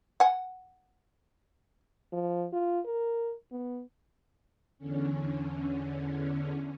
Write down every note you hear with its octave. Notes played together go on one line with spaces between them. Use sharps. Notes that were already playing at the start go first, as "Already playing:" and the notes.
F#5 G#5
F3
F4
A#4
B3
E2 D3 C#4